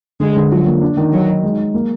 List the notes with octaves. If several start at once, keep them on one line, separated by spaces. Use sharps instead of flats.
D3 G#3
D3
F3 F#3
A#3
D4
D#3
F#3 D#4
D#4
G#3
G#3
A#3